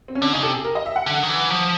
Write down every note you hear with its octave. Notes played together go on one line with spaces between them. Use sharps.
C4
C#4
D3 D4
C#3 D#4
C3 A4
G#4
A#4
D#5
E5
F#5
D3
D#3
E3
F3